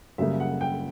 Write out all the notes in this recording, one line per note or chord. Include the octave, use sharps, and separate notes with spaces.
F#2 C#3 G3 A#3 E5
F#5
G5